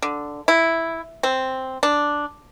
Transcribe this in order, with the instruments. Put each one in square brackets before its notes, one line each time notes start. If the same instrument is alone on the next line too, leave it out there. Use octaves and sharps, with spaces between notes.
[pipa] D3
E4
C4
D4